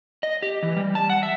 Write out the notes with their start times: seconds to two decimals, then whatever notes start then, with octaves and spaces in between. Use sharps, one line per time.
0.23 D#5
0.42 G4
0.63 E3
0.76 G3
0.95 A5
1.10 F#5
1.23 E5